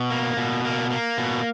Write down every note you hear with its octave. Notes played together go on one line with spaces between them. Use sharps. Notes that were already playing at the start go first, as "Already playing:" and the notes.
Already playing: B2
A#3
B2
A#3
A#3
B2